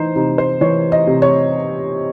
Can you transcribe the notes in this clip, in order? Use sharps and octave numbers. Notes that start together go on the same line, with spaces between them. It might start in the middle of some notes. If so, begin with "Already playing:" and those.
Already playing: E3 D#4 C5
C3 D#4
C5
E3 C#5
D#5
C3
C#5